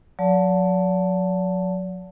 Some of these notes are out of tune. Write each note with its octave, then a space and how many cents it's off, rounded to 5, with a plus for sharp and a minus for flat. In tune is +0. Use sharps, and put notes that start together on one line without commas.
F#3 -35 D5 -40 A5 +5